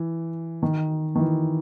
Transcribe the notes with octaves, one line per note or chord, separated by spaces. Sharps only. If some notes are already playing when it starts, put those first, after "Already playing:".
Already playing: E3
D#3
D#3
E3